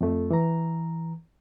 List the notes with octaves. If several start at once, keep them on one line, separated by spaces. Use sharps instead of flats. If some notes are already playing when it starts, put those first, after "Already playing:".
F2 A3
E3 A#5